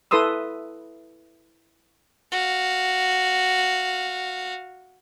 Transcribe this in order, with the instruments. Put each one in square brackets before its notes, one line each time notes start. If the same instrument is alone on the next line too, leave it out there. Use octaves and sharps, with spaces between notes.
[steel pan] E4 A4 B4 C6 D#6 E6
[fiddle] F#4 F5